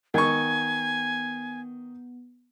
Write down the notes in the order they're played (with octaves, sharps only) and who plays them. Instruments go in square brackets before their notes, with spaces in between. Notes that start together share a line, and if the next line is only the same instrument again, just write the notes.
[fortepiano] D#3 C#6 [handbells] B3 [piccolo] G#5